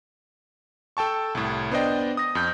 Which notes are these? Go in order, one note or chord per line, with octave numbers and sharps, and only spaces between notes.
A4 G5 A5 C#6
C2 A2
B3 D4 C5 D5 D#5 G5
D#6 A#6
F2 G6